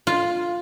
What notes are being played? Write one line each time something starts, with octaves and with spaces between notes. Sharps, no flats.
F4